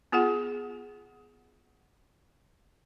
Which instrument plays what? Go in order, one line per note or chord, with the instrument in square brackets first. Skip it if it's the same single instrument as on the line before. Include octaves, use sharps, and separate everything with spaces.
[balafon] B3 F4 G#4 F#5